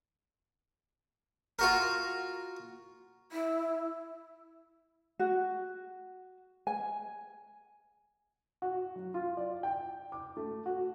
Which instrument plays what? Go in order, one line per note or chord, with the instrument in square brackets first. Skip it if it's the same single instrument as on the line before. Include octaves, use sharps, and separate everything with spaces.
[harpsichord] F4 F#4 A#4
[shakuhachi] E4
[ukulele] F#4
G#5
[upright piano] F#4
F#3
F4
D5
G5
D6
A3
F#4